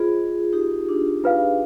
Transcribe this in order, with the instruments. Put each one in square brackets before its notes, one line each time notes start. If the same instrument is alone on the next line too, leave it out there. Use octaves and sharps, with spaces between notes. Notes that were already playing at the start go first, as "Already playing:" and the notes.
Already playing: [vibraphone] F4 G#4 [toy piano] C5 D#5 B5
[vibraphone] D#4 G4
D4
[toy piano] F4 B4 F5